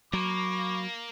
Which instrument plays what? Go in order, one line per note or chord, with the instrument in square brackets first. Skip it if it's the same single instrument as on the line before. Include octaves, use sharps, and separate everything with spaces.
[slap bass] F#3 [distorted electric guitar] A#3 [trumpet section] B5 C#6 D6